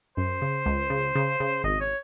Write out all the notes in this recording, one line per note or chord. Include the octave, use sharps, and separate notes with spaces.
F#2 C5
C#3
C#2
C#3
C#3
C#3
G#1 D#5
C#5